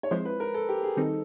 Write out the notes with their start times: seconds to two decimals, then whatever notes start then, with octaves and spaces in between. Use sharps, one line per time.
0.03 C#5
0.11 F3 G#3 C4 E4 C5
0.25 B4
0.40 A#4
0.54 A4
0.69 G4
0.83 G#4
0.97 D#3 G3 C4 D#4 A4